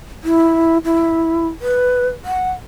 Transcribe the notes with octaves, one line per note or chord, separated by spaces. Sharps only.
E4
E4
B4
F#5